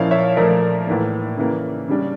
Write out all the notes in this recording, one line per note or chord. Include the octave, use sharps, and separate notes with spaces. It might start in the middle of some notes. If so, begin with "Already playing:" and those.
Already playing: A#2 F3 C#4 E4 D5 F5
C#5 E5
A#2 F3 A3 A#4 D5
A2 E3 A#3
C#3 E3 A#3
C#3 G3 D4